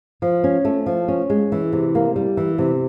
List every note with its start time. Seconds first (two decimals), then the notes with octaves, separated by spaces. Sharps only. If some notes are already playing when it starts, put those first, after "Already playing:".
0.22 F3
0.44 C#4
0.65 A3
0.86 F3
1.08 C#4
1.30 G#3
1.52 E3
1.73 C3
1.95 A#3
2.16 G3
2.37 E3
2.58 C3